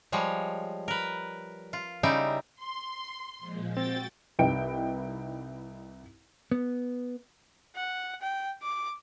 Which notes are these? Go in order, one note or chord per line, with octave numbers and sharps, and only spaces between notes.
F3 G3 G#3 C#5
A#4 B4
F4
C#3 G3 D#4 E4 E5 G5
C6
A#2 F3 G#3
C4 F#4 G5 A6
C2 D#4 E4 B4 G5 D7
B3
F#5
G5
D6